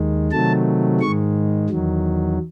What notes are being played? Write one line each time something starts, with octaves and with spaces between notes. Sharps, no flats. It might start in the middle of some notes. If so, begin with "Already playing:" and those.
Already playing: D#2 D#3 G#3
C3 D#3 F#3 A3 A5
G#2 D#3 G#3 C#6
E2 D#3 F#3